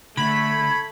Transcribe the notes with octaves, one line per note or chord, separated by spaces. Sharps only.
D3 A3 B5 G#6